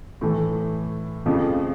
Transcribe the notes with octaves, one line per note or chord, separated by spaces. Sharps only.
A2 E3 A3
F2 C#3 F3 A3